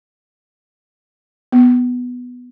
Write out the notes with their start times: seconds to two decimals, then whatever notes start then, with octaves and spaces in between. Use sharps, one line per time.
1.52 B3